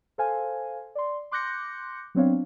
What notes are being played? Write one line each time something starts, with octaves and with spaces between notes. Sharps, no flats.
A4 C5 F5 G#5
D5 C6
C6 D6 F#6 G6 A#6 C#7
F#3 B3 C4 D4 C#5 F5